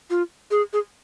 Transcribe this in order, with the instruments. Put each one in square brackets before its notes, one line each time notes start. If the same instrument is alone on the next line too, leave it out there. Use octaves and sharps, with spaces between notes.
[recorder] F4
G#4
G#4